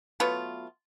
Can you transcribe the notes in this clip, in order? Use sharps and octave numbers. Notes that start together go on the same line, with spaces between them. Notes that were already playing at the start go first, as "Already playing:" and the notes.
F#3 A3 B3 F4